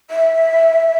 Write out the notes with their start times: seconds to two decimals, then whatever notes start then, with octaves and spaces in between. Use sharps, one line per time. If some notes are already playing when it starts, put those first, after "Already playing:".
0.11 E5